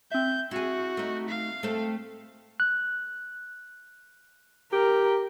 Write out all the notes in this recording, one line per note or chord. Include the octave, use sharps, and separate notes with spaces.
C4 E5 G6
E4 F#4 G#4
A3 D#4
F5
A3 C4 A4
F#6
G4 A#4